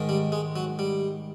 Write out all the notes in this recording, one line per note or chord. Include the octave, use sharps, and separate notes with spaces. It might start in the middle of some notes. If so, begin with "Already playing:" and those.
Already playing: G#2 D#3
G3
G#3
F#3
G3